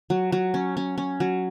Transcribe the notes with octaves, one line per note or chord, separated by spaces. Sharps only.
F#3
F#3
C#4
C#4
C#4
F#3